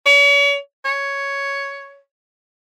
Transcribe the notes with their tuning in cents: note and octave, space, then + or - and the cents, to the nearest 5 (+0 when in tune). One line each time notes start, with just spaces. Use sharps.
C#5 +40
C#5 +5